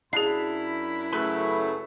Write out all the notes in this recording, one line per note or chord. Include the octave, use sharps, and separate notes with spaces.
F#2 D4 E4 G#4 B5 C7
C#3 F#3 A3 B4